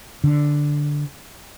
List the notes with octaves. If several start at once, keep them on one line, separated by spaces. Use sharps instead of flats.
D3